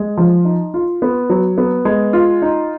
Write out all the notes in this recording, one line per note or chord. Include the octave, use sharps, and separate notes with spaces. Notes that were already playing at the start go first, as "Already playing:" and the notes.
Already playing: G#3
F3
D#4
F4
B3
F#3
B3
G#3
F4
D#4